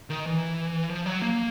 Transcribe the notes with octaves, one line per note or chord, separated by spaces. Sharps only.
D#3
E3
F3
F#3
A#3